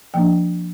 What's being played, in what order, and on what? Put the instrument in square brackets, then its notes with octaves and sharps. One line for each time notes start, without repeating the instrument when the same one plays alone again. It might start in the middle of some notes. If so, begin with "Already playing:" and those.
[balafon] F3 A#3 D4 G5